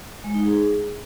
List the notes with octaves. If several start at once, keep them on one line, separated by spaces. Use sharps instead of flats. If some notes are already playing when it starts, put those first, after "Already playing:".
G#3
D#4
G#4